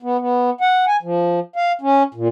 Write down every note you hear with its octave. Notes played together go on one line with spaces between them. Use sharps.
B3
B3
F#5
G#5
F3
F5
C#4
A#2